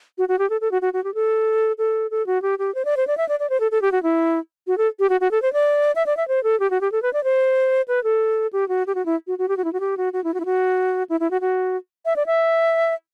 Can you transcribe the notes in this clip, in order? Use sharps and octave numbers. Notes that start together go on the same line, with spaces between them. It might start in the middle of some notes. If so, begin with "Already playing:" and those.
F#4
F#4
G4
A4
A4
F#4
F#4
F#4
G4
A4
A4
A4
F#4
G4
G4
C5
D5
C5
D5
E5
D5
D5
C5
A4
A4
G4
F#4
E4
F#4
A4
G4
F#4
F#4
A4
C5
D5
E5
D5
E5
C5
A4
G4
F#4
G4
A4
B4
D5
C5
B4
A4
G4
F#4
G4
F#4
E4
F#4
F#4
G4
F#4
E4
F#4
G4
F#4
F#4
E4
F#4
E4
F#4
E4
E4
F#4
F#4
E5
D5
E5